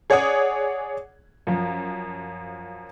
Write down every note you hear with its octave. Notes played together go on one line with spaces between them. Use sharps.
G#4 C#5 D5 F#5 D#6 G#6
F#2 F3